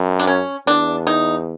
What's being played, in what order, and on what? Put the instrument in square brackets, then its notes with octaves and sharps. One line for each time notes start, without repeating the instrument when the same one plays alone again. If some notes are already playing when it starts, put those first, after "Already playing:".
Already playing: [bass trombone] F#2
[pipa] D4
C#4
[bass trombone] E2 [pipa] D4
[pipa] D#4